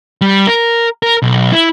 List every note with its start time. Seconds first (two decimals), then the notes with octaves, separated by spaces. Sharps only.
0.21 G3
0.47 A#4
1.03 A#4
1.22 B1
1.52 E4